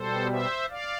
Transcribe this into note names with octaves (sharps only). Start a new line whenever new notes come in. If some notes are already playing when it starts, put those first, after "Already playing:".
Already playing: B2 G3 A4 C5
C5 E5
D5 F5